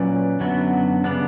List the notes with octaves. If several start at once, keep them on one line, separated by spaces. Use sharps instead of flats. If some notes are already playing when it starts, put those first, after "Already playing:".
Already playing: A#2 F#3 C#4 B4 D5
F#2 D3 F#3 B3
C#3 G3 B3 D4